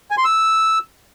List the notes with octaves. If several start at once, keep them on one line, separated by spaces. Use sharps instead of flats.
G#5
C6
E6